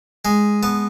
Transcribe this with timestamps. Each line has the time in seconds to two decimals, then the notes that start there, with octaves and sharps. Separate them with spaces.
0.25 G#3 G#5
0.63 B3 A5